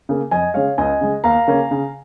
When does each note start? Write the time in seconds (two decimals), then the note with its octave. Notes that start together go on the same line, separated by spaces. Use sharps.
0.09 C#3 A#3
0.31 F2 D#5 G#5
0.54 C#3 G#3 C#5 F5
0.78 C#2 D#5 G#5
1.01 C#3 G#3
1.24 D#2 F5 A#5
1.48 C#3 A#3 C#4
1.71 C#3